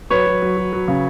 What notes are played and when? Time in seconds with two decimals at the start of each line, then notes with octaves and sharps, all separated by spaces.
0.10 F#3 B4 C#5
0.26 F#3
0.42 F#3
0.57 F#3
0.73 F#3
0.88 C#3